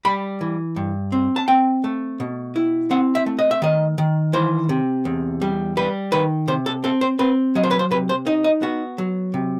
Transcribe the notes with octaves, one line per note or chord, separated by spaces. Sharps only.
G3 B5
E3
G2
C4
A5
C4 G5
A3
B2
E4
C4 F#5
E5
A3
D#5
E5
D#3 D#5
D#3
E3 C5
C3
E2
G3
G3 B4
D#3 B4
C3 C5
A4
C4 A4
C5
C4 B4
F#3 D#5
C5
B4
C5
C3 B4
C5
D#4 D#5
D#5
B3 F#4
F#3
C3